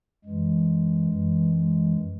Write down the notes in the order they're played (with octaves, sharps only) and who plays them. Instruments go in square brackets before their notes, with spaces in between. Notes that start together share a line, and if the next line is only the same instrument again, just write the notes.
[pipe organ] F#2 E3 G#3
F#2 E3
G#3